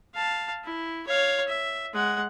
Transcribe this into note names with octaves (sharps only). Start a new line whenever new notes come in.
F5 A5
E4
C#5 F5
E5
G#3 F#5